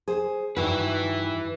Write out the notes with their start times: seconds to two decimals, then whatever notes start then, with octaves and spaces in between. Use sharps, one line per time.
0.08 G#4 C5
0.57 G2 D#3 E4 F#4 B4